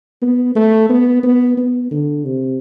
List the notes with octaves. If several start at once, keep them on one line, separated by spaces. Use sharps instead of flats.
B3
A3
B3
B3
B3
D3
C3